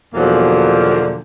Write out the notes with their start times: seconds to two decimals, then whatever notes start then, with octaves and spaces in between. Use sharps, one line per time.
0.14 E2 B2 D3 F3 F#3 A#3